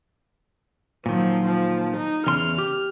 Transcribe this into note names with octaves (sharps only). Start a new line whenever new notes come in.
A#2 D#3 F3 F#3
F3
D#4
E2 C#3 C6 F6
G4